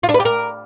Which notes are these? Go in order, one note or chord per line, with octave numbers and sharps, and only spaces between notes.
F4
D4
B4
G4
A#4